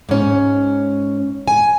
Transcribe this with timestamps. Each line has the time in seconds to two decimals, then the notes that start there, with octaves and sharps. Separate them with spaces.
0.09 G#2 C#4
1.48 G#5